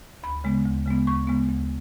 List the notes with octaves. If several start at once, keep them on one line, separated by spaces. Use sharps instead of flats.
D2 B5
C#3 G#3 B3
D2
C#3 G#3 B3
D2 C#6
C#3 G#3 B3
D2